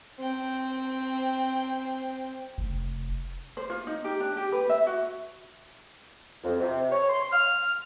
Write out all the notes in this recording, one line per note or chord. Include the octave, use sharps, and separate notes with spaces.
C4 G5
F1
C5
F4
D#4
G4
D4
G4
B4
E5
F#4
F2
C3
C#5
C6
F6